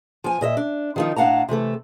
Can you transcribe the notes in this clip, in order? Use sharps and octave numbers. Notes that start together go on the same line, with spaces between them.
F3 G#5
A#2 D#5 E5
D4
D#3 F3 D#4
A2 D4 F5 F#5 A5 A#5
C3 E3 A3 A4